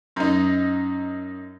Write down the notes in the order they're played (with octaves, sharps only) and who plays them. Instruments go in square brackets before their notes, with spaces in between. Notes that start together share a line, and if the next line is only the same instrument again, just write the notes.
[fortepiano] F#2 D#4